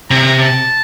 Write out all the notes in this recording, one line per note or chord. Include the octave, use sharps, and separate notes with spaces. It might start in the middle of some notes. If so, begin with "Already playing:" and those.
C3 A#5
A5